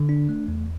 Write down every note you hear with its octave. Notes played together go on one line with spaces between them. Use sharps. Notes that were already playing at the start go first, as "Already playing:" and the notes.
Already playing: D3
D4
A3
E2